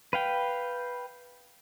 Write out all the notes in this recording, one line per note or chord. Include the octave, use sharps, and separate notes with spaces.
B4 F5 G5